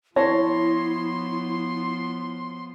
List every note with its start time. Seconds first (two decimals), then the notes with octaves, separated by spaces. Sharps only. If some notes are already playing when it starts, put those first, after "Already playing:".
0.16 F3 B3 E4 C#5 A5 C6 A#6